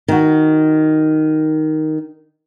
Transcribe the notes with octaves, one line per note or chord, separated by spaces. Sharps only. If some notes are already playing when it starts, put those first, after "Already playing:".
D#3 F#4